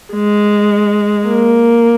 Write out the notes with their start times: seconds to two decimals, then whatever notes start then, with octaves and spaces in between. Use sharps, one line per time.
0.14 G#3
1.27 A#3